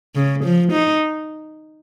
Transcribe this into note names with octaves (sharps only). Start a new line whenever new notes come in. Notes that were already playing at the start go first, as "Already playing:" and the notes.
C#3
F3
D#4